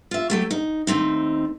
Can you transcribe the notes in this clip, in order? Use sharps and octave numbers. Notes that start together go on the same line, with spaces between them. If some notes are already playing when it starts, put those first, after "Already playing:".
F4 E5
F#3 A3 G4
D#4
D#2 A3 C4 D#4